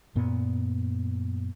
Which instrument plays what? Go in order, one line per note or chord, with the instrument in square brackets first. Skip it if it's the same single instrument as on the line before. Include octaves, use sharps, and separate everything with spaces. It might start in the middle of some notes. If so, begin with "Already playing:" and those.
[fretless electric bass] F#2 A#2 B3